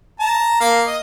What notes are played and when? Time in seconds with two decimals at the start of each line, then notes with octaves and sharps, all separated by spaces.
0.20 A5 A#5
0.60 A#3 F5
0.87 D#5